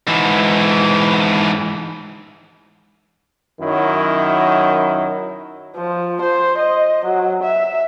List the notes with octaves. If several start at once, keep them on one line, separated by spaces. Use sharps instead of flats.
G#2 E3
F#2 D#3 F#3 E4
F3
C5
D#5
F#3
E5